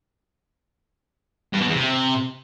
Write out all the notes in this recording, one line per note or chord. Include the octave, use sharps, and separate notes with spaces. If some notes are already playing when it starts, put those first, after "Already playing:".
G2
B2
E2
C3